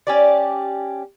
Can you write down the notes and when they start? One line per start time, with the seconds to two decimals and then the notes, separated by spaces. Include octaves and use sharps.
0.07 C#4 G4 D5